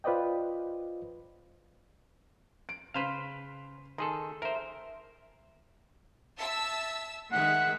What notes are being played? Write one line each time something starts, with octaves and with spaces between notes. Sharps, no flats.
F4 B4 C5 D5 D#5 G5
D7
C#3 B4 C5 F5 C6 B6
D#3 G#4 A4 C6
A#4 C5 E5
E5 A5 E6
D#3 G#3 E5 F#5